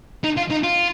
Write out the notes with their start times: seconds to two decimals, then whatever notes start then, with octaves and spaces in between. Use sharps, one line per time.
0.24 D#4
0.37 F4
0.51 D#4
0.63 F4